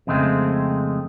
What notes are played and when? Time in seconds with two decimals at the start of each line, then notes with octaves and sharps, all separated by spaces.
0.07 F2 C#3 G#3 A3 C4